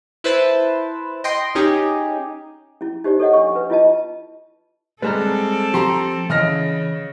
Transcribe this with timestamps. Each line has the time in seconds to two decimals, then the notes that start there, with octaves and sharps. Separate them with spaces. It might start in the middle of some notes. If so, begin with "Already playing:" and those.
0.24 E4 B4 C5 A5
1.24 D#5 G5 C6
1.55 C#4 D#4 G4 G#4
2.81 C#4 E4
3.04 D#4 G4 C5 D5
3.19 A4 C#5 D#5 F#5
3.33 D4 C#6
3.55 B4
3.70 E4 F4 D#5 A5
5.02 G3 G#3 C4 A4 B4 A5 A#5
5.74 F3 G4 A#5 C6
6.30 C#3 E3 D#5 F6 A#6